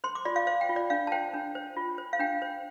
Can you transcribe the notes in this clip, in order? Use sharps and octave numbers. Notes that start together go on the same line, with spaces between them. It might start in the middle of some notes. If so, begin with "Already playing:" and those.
C5 C6
D6
F4 D5
F5
C5 F5
G5
F4
D5
D4 F5
A5
C5 G5
D4
C5
F4
C5
F5
D4 G5
C5